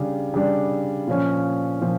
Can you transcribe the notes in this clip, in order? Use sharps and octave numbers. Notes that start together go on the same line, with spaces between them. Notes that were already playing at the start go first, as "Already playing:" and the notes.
Already playing: C#3 G3 D4
C#3 G3 D4
A#2 F3 C#4
A#2 F3